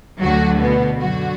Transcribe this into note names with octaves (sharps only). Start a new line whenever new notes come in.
D2 D3 F#3 F#4
B2 B3
F#2 D3 F#3 F#4